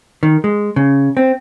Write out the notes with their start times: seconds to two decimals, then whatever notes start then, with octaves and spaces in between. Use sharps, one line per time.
0.23 D#3
0.44 G#3
0.76 C#3
1.17 C4